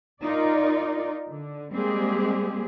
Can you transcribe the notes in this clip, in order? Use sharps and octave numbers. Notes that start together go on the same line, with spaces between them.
D#4 F4 A#4 D5
D3
G3 G#3 A#3 C4 G4 G#4